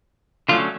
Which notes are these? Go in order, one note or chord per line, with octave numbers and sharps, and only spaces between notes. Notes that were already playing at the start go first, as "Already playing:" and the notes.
D3 F#3 A3 C#4 F4